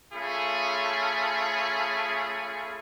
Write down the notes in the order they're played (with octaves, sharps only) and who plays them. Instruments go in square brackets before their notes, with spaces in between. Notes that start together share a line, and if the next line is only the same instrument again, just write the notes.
[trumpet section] A3 C#4 F4 G#4 B5